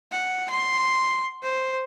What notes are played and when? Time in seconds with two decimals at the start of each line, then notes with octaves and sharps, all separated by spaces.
0.12 F#5
0.50 C6
1.43 C5